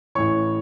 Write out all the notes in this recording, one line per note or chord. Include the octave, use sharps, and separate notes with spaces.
A1 A2 E3 C#5 C#6